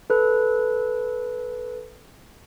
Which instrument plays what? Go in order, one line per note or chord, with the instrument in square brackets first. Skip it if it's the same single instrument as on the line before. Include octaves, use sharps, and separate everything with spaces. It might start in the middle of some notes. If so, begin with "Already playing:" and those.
[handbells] A4 B4